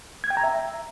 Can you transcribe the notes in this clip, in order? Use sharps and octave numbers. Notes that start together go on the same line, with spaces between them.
G#6
G5
A#5
E5